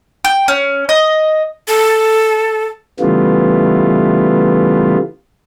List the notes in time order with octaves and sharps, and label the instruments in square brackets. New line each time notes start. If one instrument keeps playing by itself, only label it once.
[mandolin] G5
C#4
D#5
[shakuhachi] A4
[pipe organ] C#3 E3 G3 A3 B3 F4